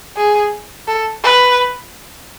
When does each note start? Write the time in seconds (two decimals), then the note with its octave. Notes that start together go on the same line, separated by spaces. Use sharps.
0.17 G#4
0.88 A4
1.23 B4